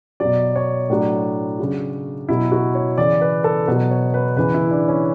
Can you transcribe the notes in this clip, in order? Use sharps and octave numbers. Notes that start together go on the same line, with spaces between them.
B2 F#3 D5
C#5
A2 F#3 D4
C#3 F#3
B2 F#3 E4
F#4
C#5
C#3 E3 D5
B4
A4
B2 F#3 B4
C#5
B4
C#3 E3 B4
E4
D4
C#4